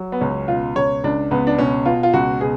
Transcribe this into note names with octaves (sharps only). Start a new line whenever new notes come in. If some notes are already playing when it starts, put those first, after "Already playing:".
Already playing: F#3
B3
C#2 C#4
B2 F4
C#2 C#5
C#2 D4
C#2 B3
D4
B2 C#4
B2 F4
F4
C#2 F#4
B2 G#4